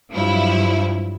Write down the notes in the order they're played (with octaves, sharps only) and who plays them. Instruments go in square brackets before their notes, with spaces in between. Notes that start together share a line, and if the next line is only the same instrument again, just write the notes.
[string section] G2 F3 F#3 E4